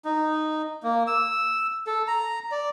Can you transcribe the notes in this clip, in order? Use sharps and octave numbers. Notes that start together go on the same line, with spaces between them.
D#4
A#3
E6
A4
A#5
D5